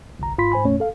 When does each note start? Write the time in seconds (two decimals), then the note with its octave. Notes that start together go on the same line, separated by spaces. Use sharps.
0.19 G1 C2 A#5
0.38 G#1 G#2 F4 B5 C6 B6
0.52 G#2 C5 G#5 B5
0.65 A1 F2 A#2 A3 C#4 C#5
0.80 A4 F5